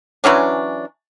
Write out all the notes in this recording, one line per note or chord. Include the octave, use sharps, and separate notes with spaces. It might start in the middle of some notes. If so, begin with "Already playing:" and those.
E3 F#3 C#4 D4